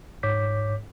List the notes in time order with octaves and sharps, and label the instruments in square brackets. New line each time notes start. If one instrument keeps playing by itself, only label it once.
[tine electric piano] G#2 C#5 D6 G6 B6